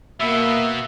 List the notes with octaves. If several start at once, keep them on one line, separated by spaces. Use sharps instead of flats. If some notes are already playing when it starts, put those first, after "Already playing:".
B2 A#3 E5